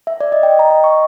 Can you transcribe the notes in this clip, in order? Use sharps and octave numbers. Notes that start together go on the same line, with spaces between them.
E5
D5
D#5
G5
A#5
D#5
C#6